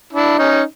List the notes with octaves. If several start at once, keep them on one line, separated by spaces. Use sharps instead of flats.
D4 E4
C#4 D#4